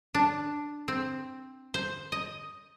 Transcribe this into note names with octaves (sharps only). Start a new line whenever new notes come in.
D4
C4
C5
D#5